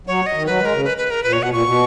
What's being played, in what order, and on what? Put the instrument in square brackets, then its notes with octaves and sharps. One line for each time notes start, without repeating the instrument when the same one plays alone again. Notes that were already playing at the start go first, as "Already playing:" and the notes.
[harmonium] F#3 [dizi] C#5
[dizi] D#5
[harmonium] D#3
[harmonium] F#3 [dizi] B4
[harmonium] G#3
[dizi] A#4
[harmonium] C#3
[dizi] B4
B4
A#4
[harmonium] A#2 [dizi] B4
[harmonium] B2 [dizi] C#5
[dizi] F#5
[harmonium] A#2 [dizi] C#6
[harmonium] B2